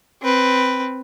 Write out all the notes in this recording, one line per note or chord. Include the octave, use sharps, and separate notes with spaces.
C4 B4